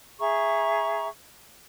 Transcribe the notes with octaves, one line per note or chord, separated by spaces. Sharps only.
G#4 E5 A#5 C#6